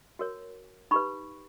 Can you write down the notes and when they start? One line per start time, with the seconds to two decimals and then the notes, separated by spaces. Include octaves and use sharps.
0.19 F#4 A#4 C#5
0.91 D#4 G4 B4 B5 C#6